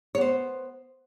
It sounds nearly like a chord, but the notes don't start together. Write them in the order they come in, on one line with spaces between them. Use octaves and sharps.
C#5 B3 C5